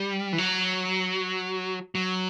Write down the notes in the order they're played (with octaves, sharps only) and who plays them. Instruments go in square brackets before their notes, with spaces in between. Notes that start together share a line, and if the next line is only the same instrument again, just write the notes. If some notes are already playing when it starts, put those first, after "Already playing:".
Already playing: [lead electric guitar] G3
E3
F#3
F#3